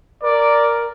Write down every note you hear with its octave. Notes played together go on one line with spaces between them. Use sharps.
A#4 D5